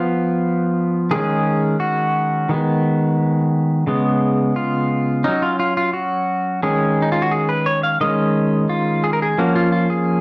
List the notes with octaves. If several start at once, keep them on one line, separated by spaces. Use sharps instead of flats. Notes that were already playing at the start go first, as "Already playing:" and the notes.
Already playing: F3 B3 F4
D#3 G#3 C#4 G#4
F#4
D#3 G#3 B3
C#3 G#3 B3
F4
F#3 C#4 D#4
F4
F4
F4
F#4
D#3 G#3 C#4 G#4
D#4
F4
F#4
G#4
B4
C#5
F5
D#3 G#3 C#4 D#5
F4
G#4
A#4
G#4
F3 A#3 C#4 F#4
F4
F4
G#4